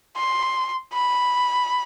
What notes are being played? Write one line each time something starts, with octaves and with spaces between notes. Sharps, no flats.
C6
B5